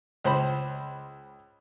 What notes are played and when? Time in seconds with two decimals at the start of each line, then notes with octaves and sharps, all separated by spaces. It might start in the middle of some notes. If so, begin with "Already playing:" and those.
0.24 C#2 C5 B5